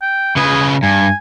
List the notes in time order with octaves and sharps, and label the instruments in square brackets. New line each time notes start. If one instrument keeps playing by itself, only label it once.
[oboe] G5
[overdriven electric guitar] C#3 B4 [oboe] G#4
[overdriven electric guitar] G2 [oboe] G#5